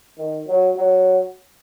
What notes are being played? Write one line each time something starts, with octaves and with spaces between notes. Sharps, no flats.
D#3
F#3
F#3